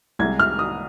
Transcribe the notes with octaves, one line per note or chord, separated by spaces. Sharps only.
C2 C3 G#3 G#6
F6
D#6